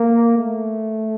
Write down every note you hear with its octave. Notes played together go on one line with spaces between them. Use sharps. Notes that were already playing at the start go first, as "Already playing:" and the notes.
Already playing: A#3
A3